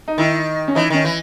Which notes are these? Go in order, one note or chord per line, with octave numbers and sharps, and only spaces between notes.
D#4
D#3 E4
C#4
E3 D#4
D#3 C#4
E3